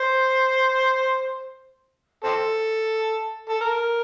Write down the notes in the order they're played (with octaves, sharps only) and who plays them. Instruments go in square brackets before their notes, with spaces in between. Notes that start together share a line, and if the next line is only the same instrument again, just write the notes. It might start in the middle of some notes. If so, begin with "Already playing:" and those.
Already playing: [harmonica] C5
C4 A4
A4
A#4